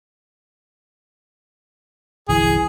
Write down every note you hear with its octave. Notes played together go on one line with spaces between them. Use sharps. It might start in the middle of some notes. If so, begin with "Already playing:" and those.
G1 C2 E3 G#4